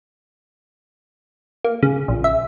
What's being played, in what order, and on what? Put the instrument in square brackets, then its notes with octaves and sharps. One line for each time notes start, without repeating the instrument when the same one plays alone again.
[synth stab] A#3
C#3
A#1
E5